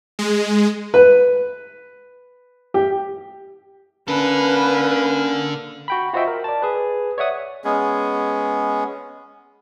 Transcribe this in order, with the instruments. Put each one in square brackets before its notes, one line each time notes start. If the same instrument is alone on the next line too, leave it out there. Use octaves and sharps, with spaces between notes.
[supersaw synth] G#3
[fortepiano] B4
G4
[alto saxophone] A#3 [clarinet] C#4 [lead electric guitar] D4 A4 [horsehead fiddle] B4
[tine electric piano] F#4 G5 B5
F4 F#4 C5 D#5 E5 G5
A#4
D5 A5
G#4 B4
C#5 D5 E5 F#5 D#6
[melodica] G#3 B3 C#4 G#4